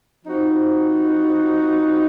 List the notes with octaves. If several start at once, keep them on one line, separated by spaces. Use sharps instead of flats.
F3 C4 D#4 F#4